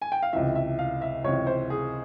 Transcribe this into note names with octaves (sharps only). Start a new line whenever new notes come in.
G#5
G5
F5
C#2 C3 E3 E5
E5
F5
E5
C#2 C3 E3 C#5
C5
G#4